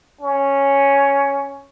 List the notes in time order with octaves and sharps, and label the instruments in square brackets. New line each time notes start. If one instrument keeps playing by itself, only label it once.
[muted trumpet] C#4